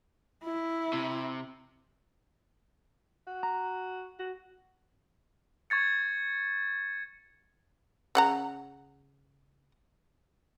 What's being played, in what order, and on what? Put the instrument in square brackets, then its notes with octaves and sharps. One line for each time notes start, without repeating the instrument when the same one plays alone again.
[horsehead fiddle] E4
[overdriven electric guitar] C3
[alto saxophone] F#4
[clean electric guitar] A#5
[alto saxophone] F#4
[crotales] C#6 G#6 A6 C#7
[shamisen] C#3 F#5 A#5